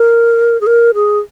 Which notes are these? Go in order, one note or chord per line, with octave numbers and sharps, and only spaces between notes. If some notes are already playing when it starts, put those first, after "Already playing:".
Already playing: A#4
G#4
A#4
G#4